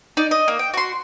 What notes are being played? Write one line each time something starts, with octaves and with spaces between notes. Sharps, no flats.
D#4 D5
D#5
A#3
G5
F#4 C6